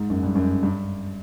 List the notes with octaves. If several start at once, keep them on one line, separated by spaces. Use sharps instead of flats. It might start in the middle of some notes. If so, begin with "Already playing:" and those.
Already playing: G#2
F#2
G2
F#2
G2